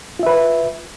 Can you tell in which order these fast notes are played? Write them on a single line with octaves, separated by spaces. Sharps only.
F4 E5 B4